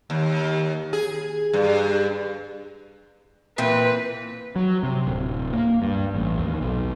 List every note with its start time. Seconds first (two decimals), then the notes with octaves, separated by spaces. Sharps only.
0.10 D#2
0.93 G#4
1.53 G2
3.58 A#2 E3 C4 B4
4.56 F#3
4.83 C3
5.07 D1
5.53 A#3
5.82 G2
6.15 A1
6.39 D#2
6.61 B1